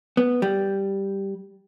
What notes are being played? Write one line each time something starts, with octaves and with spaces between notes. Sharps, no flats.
B3
G3